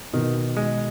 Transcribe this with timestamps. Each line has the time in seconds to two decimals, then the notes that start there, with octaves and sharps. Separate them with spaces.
0.13 B2 D#3
0.57 G#3